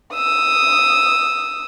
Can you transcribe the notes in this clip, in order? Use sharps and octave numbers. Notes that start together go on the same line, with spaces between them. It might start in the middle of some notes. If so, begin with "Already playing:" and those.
D#6 E6